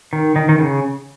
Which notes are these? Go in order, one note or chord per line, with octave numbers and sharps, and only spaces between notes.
D#3
D#3
D#3
C#3